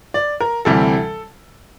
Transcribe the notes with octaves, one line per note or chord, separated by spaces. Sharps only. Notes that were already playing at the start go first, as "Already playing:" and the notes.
D5
A#4
D2 C3 E3 G3 A4